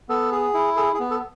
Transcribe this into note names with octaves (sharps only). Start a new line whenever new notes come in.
B3 A4
G#4
E4
G#4 A4
G#4
B3
A4